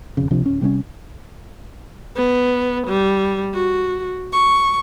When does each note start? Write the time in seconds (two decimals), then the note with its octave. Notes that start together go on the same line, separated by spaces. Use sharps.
0.17 E1 F2 C#3
0.30 C#2 C3 F3 D4
0.46 D1 C#4
0.61 C3 G3 A#3 C#4
2.17 B3
2.87 G3
3.54 F#4
4.33 C#6